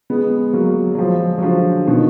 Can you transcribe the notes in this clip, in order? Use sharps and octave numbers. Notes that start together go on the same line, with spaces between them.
G#3 B3
F#3 A#3
F#3
F3 G#3
F#3
D3 F3
B2 D#3